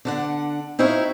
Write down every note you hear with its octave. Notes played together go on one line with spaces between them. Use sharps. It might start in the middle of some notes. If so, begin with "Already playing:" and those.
D3 D4 F#5
C4 D#4 E4 F#4 E5 F5